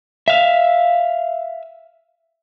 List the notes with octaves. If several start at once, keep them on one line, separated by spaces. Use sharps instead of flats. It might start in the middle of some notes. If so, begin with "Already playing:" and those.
E5 F5